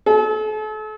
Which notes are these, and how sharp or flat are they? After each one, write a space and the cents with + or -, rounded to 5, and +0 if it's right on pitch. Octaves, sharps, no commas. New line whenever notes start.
A4 -40